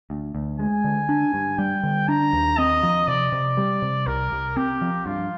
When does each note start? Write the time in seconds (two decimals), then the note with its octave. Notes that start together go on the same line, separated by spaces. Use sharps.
0.10 D2
0.35 D2
0.59 G#3 G#5
0.84 D3
1.09 D4
1.34 G2
1.58 G3 G5
1.84 D3
2.08 D4 A#5
2.33 D#2
2.58 C4 D#5
2.83 F3
3.08 C3 D5
3.32 C3
3.57 G3
3.82 C3
4.07 C2 A#4
4.32 C2
4.56 C4 G4
4.81 F3
5.06 G2 F4